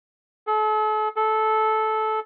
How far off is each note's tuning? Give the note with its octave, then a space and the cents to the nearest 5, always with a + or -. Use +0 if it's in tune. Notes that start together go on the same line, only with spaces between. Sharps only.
A4 -40
A4 -15